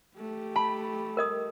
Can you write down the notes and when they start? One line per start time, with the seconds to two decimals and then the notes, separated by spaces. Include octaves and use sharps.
0.17 A3 G4
0.56 A5 B5
1.17 A#4 D#5 D#6